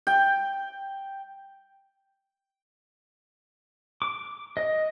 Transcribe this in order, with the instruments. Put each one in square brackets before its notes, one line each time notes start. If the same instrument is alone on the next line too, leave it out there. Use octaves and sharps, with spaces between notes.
[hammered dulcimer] G5
[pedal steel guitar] D6
D#5